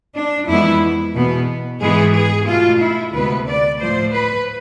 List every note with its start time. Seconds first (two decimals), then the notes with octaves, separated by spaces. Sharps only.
0.15 D4
0.48 F2 E3 G#3 B3 E4
1.15 E2 B2 B3
1.81 G#2 E3 G#3 B3 G#4
2.14 G#4
2.47 B2 A3 F4
2.80 E4
3.14 D2 C3 G#3 B3 B4
3.47 D5
3.80 A2 F3 A3 C5
4.13 B4